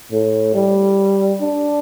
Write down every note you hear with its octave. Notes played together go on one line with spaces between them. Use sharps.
A2
G3
D4